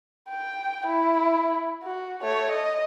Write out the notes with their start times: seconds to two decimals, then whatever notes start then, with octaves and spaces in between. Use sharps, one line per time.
0.29 G5
0.87 E4
1.83 F#4
2.23 A3 C#5
2.51 D#5